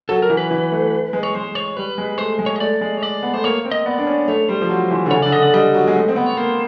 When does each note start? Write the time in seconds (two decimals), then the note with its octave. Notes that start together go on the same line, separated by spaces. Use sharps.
0.09 F#3 A4
0.22 A#4
0.30 E3
0.37 B4
0.51 E3
0.72 A3
1.13 G#3
1.23 C#5
1.34 G#3 C5
1.55 C#5
1.77 G3 B4
1.98 G#3
2.18 A3 C5
2.39 G#3
2.46 C#5
2.56 D#5
2.60 A3 D5
2.81 G#3
2.98 C#5
3.03 D5
3.23 B3
3.33 A3 C5
3.44 A#3 C#5
3.65 C4
3.71 D#5
3.86 B3 D5
3.98 D4
4.07 C#4
4.28 A3 C#5
4.48 G3 C5
4.61 F3
4.69 F#3
4.90 E3
5.06 D3
5.11 C#3 C#5
5.22 D3 D5
5.32 D#5
5.39 D3
5.43 D5
5.53 G3 D#5
5.74 F#3
5.87 G#3
5.95 A3
6.08 C4
6.16 B3
6.26 C#5
6.37 A#3 C5